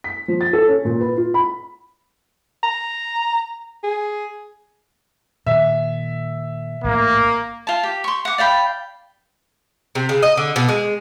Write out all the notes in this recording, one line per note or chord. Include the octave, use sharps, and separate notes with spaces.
B6
F3
A6
A4
C#4
A#2
B4
F4
B5
A#5
G#4
A#2 D#3 E5
A1 G#2 A#3
F4 A5
G4
C6 C#6
F#5 D6
D5 F5 G5 B5
C3
C#3
D#5
D3
B2
G#3